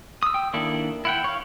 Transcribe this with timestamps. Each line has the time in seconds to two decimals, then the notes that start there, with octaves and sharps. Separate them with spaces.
0.23 D#6 E6
0.34 G5 E6
0.53 D#3 A#3 D4 E4 A4
1.05 E4 F#5 G5
1.24 C#5 F5